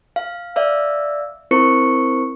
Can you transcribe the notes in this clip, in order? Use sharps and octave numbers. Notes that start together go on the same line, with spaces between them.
F5
D5 E5 F5 E6
C4 E4 A#4 C5 C#6 C#7